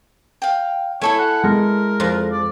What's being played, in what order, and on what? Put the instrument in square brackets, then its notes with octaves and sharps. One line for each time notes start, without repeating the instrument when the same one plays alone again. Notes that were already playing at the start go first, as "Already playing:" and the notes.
[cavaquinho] F5 G5
[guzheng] A3 [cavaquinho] E4 A4 G#5 [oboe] C#5
[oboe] F#5
[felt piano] G#3 [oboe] A#4
[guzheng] F2 F3
[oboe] D5